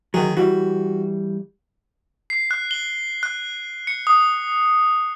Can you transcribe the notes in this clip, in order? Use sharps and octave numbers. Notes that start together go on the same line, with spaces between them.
D2 D#3 F#3 G#4
E3 G3 F#4
C7
F#6
G7
F#6
C#7
D#6